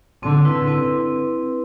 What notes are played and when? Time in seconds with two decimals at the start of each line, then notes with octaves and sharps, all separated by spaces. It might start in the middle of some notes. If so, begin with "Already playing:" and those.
0.23 D3 C4
0.45 E4 B4
0.68 C4